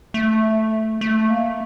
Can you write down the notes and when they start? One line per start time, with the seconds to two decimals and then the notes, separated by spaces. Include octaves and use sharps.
0.14 A3
1.01 A3
1.30 A#3